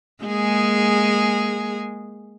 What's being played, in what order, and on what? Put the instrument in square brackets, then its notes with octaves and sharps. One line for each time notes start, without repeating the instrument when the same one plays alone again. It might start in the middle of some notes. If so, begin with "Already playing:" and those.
[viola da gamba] G#3 A#3 G#4